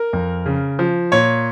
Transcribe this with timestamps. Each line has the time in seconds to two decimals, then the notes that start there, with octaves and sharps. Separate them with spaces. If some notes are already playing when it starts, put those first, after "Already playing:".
Already playing: A#4
0.13 F2
0.46 C#3
0.79 F3
1.12 A#2 C#5